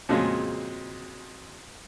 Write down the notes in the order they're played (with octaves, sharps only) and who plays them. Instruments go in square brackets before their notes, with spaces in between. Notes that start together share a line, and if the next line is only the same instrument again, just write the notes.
[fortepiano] F2 A#2 C#3 F#3 G#3